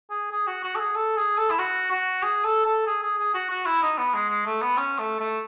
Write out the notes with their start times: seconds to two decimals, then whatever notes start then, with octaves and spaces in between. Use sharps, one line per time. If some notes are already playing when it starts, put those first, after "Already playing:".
0.10 G#4
0.31 G#4
0.47 F#4
0.63 F#4
0.75 A4
0.79 G#4
0.95 A4
1.17 G#4
1.37 A4
1.50 E4
1.59 F#4
1.91 F#4
2.23 G#4
2.44 A4
2.65 A4
2.86 G#4
3.02 G#4
3.18 G#4
3.34 F#4
3.50 F#4
3.66 E4
3.82 D#4
3.98 B3
4.14 G#3
4.30 G#3
4.46 A3
4.62 B3
4.77 C#4
4.99 A3
5.20 A3